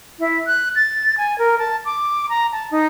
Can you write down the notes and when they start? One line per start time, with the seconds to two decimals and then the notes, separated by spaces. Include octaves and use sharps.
0.19 E4
0.47 F#6
0.76 A6
1.18 G#5
1.39 A#4
1.59 A5
1.85 D6
2.29 A#5
2.52 A5
2.71 D#4